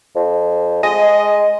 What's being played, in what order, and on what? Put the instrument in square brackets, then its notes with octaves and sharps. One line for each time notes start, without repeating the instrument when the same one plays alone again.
[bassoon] F2
[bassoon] G#3 [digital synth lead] D#5